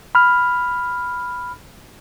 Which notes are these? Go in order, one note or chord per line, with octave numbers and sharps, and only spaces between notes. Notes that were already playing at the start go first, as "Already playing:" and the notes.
B5 F6